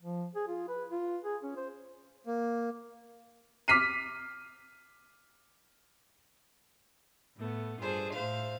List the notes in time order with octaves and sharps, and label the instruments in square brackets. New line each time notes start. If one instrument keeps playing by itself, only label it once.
[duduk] F3
G#4
F4
B4
F4
G#4
C#4
C5
[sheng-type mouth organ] A#3
[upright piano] D6 F6 B6 C7 D#7
[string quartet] A2 A3 B3
G2 F4 G#4 A4 C5
A2 C5 E5 F5